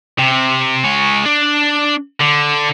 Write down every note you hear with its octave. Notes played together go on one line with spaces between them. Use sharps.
C3
G#3 C#5
D4
D3